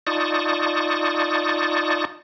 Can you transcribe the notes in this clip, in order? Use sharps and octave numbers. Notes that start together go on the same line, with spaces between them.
D#4 F4 D5 A5 C#6 D#6